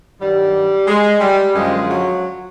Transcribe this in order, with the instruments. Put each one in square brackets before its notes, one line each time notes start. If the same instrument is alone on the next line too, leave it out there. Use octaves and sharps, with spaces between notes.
[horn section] G2 D#3 F#3 G3
G#3
G3
F#2 D3 F3 G#3
F#3